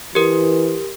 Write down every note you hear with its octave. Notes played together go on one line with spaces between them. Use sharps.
E3 G4 A#4